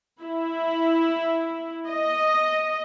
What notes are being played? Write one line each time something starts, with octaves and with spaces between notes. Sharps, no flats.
E4
D#5